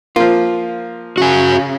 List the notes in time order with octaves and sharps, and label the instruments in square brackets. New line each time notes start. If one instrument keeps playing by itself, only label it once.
[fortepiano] F3 A#3 [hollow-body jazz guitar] F4
[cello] C#3 [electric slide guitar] F#4 G#5